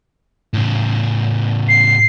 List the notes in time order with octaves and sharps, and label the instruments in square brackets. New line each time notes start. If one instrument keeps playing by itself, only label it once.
[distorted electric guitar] A2 C#3
[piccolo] C7